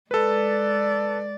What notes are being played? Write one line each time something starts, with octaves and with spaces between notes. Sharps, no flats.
G#3 A4 B4 D5